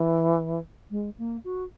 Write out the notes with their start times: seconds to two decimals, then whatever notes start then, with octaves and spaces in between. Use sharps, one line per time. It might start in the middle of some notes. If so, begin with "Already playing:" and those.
Already playing: E3
0.90 G#3
1.18 A#3
1.44 F#4